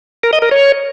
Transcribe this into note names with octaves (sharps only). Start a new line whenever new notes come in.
A#4
D#5
A#4
C#5